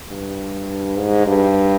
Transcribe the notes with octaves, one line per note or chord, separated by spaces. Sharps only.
G2
G#2
G2